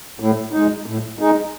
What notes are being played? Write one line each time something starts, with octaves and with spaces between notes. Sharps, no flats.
A2
G#3 D#4
A2
G#3 D#4